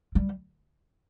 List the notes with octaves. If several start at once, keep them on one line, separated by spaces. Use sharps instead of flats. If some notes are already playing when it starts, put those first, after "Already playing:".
G3